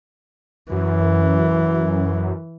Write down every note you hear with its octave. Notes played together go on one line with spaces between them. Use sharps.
F#2 E3